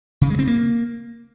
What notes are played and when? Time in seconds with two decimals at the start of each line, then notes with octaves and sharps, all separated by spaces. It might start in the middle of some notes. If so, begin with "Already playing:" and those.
0.21 C#3
0.30 G#3
0.39 C4
0.47 A#3